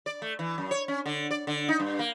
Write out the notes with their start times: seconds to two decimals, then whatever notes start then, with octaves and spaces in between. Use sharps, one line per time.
0.06 D5
0.22 A3
0.39 E3
0.58 F#2
0.71 C#5
0.88 C#4
1.06 D3
1.31 D5
1.47 D3
1.68 D#4
1.80 G2
1.99 A#3